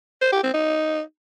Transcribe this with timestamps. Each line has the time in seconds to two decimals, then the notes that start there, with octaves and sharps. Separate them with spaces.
0.21 C5
0.32 G4
0.43 C4
0.54 D#4